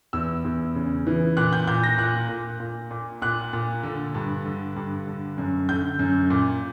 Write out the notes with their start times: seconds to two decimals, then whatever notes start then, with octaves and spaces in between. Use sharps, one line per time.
0.13 E2 E6
0.44 E2
0.75 C#3
1.07 E3
1.37 A#2 F#6
1.53 G6
1.67 A#2 G6
1.83 A#6
1.98 A#2 F#6
2.29 A#2
2.60 A#2
2.91 A#2
3.22 A#2 F#6
3.53 A#2
3.83 D3
4.14 G2
4.46 D3
4.76 G2
5.07 D3
5.38 F#2
5.69 D3 G6
5.99 F#2
6.30 A#2